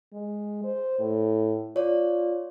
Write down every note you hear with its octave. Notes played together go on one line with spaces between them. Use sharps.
G#3
C5
A2
F4 C#5 D5